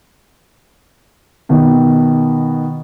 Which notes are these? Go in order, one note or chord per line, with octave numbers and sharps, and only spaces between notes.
B2 D#3